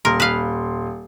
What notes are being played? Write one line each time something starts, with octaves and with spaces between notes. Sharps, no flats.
D#1 A#4 C6
B4 F5